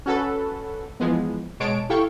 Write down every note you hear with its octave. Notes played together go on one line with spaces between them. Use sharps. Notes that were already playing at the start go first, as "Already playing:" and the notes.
C#4 F#4 A4 B4
E3 F3 G#3 B3
B2 G#3 C#5 A5 D7
E4 G4 A4 F5 G5 C#6